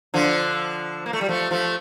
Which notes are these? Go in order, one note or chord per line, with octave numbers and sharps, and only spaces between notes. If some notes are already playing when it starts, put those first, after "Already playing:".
D3 F3
A#3
A3
G3
F3 A3
F3 A3